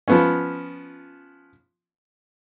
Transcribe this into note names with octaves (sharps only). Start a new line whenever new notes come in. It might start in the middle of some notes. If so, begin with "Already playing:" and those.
F3 B3 C#4